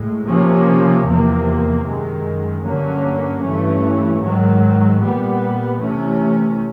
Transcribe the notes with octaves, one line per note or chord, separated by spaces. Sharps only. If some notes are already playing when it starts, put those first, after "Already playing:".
Already playing: A2 G#3
C3 F3 A#3 C#4
E2 C3 F3 A#3
F#2 D#3 G#3
G2 D3 F#3 A#3 C#4
G2 E3 A3 C#4
G#2 D#3 F#3
A#2 G3 B3
C3 E3 A3 C#4